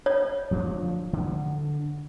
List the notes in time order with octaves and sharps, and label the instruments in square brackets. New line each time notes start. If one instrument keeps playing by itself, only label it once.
[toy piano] C#5
[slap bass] D1 F3 D4
D3